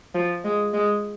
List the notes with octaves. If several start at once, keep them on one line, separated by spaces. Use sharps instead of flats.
F3
G#3
G#3